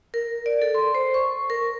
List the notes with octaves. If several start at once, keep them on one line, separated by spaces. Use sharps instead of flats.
A#4
D5
A4
C6
C5
C#6
A#4